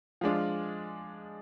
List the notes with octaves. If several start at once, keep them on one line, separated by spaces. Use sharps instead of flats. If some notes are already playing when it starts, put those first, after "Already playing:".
F3 G#3 D4 F4